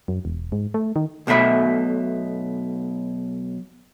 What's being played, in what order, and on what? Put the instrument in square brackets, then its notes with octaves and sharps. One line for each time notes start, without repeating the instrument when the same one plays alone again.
[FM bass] F#2
E1
G#2
A3
D#3
[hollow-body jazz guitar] B1 B2 A3 E5 B5